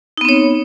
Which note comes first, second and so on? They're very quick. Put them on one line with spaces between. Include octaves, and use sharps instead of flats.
D#4 B3 C4 C#5